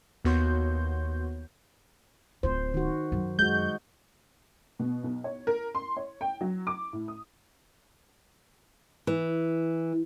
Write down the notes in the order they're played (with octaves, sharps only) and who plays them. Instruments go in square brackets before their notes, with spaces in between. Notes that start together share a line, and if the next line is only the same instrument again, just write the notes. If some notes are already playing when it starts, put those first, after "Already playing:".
[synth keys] D#2 B3 F#4 C#5 C6 G6
[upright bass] D1 F4 [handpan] C5
[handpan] D#3 F#4
[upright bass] F#2 F#3
[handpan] G#3 F#4 [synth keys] G6
[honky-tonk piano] B2
B1
C#5
A#4
C6
C#5
G5
F#3
D6
A2
D#6
[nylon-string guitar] E3